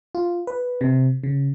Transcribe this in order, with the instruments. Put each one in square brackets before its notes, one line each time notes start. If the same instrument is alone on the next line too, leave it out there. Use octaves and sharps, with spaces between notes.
[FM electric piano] F4
B4
C3
C#3